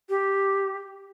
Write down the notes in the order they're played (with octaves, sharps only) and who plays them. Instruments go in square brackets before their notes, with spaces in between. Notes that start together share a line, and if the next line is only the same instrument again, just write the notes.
[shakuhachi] G4